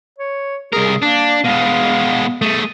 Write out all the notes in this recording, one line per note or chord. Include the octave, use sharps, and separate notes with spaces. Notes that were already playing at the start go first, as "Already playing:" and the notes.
C#5
C2 G#4 A#4
A#3 D4
B2 G#3 F5
A3 G#4 D#6